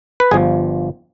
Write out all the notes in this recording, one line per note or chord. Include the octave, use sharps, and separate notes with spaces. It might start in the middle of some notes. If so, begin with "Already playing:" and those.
B4
G1 G2 F3 G#4